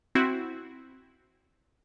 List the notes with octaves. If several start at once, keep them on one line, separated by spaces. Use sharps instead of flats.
C4 E4 F#4